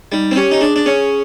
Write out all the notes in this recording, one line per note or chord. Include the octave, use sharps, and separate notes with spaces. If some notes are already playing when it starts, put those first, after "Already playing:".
G3 D#4
C4
C#4 G4
D#4
D4 G#4
D4
C#4 G#4